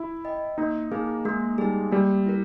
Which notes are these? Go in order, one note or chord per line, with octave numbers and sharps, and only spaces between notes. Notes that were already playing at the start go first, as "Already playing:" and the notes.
Already playing: E4
D#5 G5
A#3 D#4
A#3 D#4 G#4
G#3 A#3
G3 D#4 G#4
G3 A#3
E4 A#4